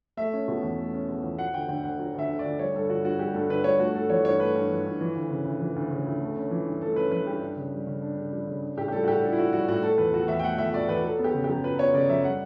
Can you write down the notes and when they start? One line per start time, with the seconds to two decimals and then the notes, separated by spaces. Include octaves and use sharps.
0.17 A3 E5
0.33 C#4
0.48 B2
0.63 E2
0.79 A3
0.93 C#4
1.09 B2
1.23 E2
1.39 F#3 F#5
1.53 D2 G5
1.68 D3 G5
1.83 D2 F#5
1.99 F#3
2.14 D2 E5
2.29 D3
2.39 D5
2.44 D2
2.59 G3 C#5
2.74 G2 A4
2.89 D3 F#4
3.04 G2 F#4
3.19 G3 G4
3.34 G2 A4
3.49 D3 B4
3.64 G2 C#5
3.79 A3 F#4
3.95 G2 A4
4.10 E3 C#5
4.25 G2 C#5
4.40 A3 B4
4.55 G2
4.70 E3
4.85 G2
5.01 E3
5.15 D2
5.31 C#3
5.45 D2
5.61 E3
5.76 D2
5.91 C#3
6.06 D2
6.21 A3
6.36 C#4
6.51 E3
6.66 G2
6.81 A3 A4
6.96 C#4 B4
7.11 E3 B4
7.27 G2 G4
7.42 D4
7.56 C#3
7.72 G3
7.87 C#3
8.02 D4
8.17 C#3
8.32 G3
8.47 C#3
8.63 D4
8.77 A2 G4
8.88 G4
8.92 G3 A4
9.04 F#4
9.07 A2 G4
9.23 D4 A4
9.32 E4
9.38 A2 F#4
9.53 G3 F#4
9.68 A2 F#4
9.83 A3 A4
9.98 E2 B4
10.13 B2 F#4
10.28 E2 E5
10.39 G5
10.43 A3 F#5
10.58 E2 E5
10.74 B2 D5
10.88 E2 B4
11.04 F#3 A4
11.19 B3
11.24 G4
11.34 C#3
11.44 F#2 G4
11.64 F#3 B4
11.79 B3 C#5
11.94 C#3 D5
12.09 F#2 E5
12.24 G3 F#5